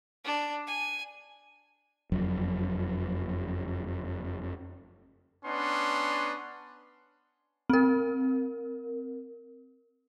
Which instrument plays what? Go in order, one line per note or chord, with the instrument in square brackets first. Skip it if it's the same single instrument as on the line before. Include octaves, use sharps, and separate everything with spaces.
[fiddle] D4
G#5
[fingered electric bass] F#1 F2 F#3
[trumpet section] B3 C#4 D4 C6
[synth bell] C4 A#4